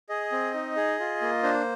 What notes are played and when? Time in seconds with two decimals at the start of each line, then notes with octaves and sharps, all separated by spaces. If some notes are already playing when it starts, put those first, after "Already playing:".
0.09 G#4 D#5
0.32 C4
0.54 D#4
0.76 G#4
1.00 F4
1.22 A#3
1.43 D4 C5